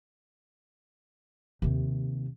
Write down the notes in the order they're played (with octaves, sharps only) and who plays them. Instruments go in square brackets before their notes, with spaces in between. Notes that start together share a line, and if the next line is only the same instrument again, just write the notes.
[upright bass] D#2 C3